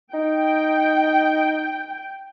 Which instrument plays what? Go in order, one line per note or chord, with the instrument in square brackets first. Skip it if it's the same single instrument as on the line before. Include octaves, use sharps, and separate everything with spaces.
[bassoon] D#4 [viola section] G5